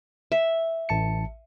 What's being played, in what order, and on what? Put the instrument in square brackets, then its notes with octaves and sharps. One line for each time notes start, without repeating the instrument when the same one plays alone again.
[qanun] E5
[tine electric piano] A1 A5 C#7